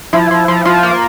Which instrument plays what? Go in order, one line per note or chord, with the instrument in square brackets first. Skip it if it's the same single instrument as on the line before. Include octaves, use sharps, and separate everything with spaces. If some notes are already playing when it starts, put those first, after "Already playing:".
[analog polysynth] F3 [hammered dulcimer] E4
[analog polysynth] F3
F3
[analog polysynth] F3 [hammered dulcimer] F4
[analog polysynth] A#3